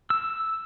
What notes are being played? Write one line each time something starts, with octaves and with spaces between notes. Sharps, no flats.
E6